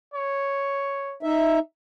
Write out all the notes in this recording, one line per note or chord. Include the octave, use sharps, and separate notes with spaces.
C#5
D#4 E5